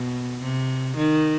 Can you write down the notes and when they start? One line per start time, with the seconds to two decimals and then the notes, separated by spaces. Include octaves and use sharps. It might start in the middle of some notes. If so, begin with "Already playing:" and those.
Already playing: B2
0.41 C3
0.96 D#3